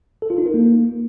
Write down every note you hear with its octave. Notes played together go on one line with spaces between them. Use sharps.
A4
F4
D#4
A#4
A#3